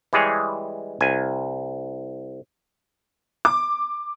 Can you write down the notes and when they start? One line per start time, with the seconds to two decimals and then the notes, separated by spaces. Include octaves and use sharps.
0.13 E3 G3 G#3 G#4 C#5
1.01 C2 G#5
3.45 D6